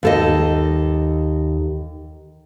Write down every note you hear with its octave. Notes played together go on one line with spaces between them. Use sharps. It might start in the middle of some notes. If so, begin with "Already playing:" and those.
D#2 A4 D#5